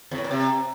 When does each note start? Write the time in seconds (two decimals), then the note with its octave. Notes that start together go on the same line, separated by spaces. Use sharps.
0.11 E2
0.18 A2
0.24 A#2
0.31 C3